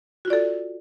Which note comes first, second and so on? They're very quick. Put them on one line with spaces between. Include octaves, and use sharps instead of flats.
F#4 F4 D5 A4